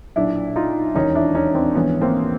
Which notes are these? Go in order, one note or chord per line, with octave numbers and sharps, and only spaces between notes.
B1 A#2 D4 E4
D#4 F4
E1 D#2 D#3 C#4 D#4
D4 E4
C#4 D#4
C4 D4
A#1 G#2 E3 B3 C#4
A#3 C4